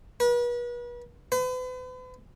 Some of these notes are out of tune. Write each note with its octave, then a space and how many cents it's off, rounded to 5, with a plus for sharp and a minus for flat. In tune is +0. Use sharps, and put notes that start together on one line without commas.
B4 -40
B4 +40